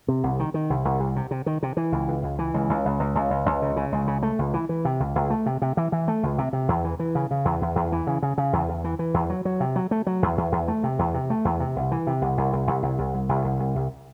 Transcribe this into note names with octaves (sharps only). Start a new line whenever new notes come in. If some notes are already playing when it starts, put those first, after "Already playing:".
C3
C2
D#3
D#3
C2
C2
C2
C3
C3
D#3
C3
E3
C#2
C#2
C#2
E3
C#2
C#2
C#2
C#2
C#2
C#2
C#2
C#3
C#3
C#2
C#3
A3
C#2
E3
E3
C3
C#2
C#2
A3
C3
C3
E3
E3
A3
C#2
C3
C3
E2
E3
E3
C#3
C#3
E2
E2
E2
E3
C#3
C#3
C#3
E2
E2
E3
E3
E2
F#3
F#3
C3
F#3
A3
F#3
E2
E2
E2
A3
C3
E2
C3
A3
E2
C3
C2
E3
C3
C2
C2
C2
C2
C2
C2
C2
C2
C2
C2
C2